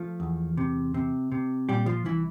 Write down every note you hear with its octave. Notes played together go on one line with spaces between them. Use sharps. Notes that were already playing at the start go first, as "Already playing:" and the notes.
Already playing: F3 A3
E2
C3
C3
C3
A#2 G3 G4
F3 F4
C2 E3 E4